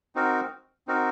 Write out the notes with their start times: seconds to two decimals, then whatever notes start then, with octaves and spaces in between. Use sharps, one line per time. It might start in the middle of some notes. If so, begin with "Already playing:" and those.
0.15 C4 D#4 F#4 A#4
0.87 C4 D#4 F#4 A#4